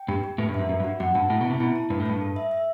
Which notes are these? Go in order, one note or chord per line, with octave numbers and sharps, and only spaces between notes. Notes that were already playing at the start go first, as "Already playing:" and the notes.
Already playing: G5
G2 G4
G4
A2 B4
G2
F#2 E5
F#2 F#4
G2
F#4
F#2 F#5
G2 A5
A2 E4
B2
C3 A5
B2 E4
A5
G2 B4
A2
G2 A5
A4
E5
E5